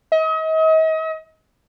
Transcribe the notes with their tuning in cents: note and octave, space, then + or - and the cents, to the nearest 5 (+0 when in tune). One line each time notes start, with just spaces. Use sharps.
D#5 +40